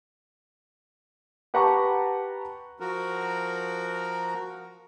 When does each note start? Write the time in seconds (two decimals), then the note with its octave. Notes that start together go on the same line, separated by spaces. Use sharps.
1.54 G4 B4 F#5 A5 A#5 C#6
2.80 F3 F#4 A#4